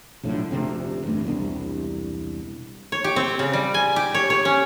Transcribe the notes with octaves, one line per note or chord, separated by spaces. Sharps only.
B1 F2 A2 D3
F1 D2 C3 C4
A1 G2 A3
E1 C2 B3 D4
C#5
G4
C4
C#3
G3
G#5
G4
C#5
C#5
C#4